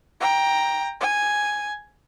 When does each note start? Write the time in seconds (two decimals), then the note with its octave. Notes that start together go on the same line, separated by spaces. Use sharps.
0.21 G5 A#5
1.00 G#5